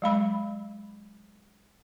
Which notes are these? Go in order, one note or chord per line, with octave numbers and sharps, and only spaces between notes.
F#3 G#3 B5